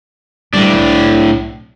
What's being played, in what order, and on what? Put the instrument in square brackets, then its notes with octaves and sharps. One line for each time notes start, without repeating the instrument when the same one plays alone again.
[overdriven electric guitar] A2 D4 [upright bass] G3
[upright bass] C2